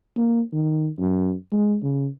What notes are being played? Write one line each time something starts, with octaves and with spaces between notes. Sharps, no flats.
A#3
D#3
F#2
G#3
C#3